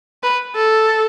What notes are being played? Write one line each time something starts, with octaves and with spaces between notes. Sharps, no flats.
B4
A4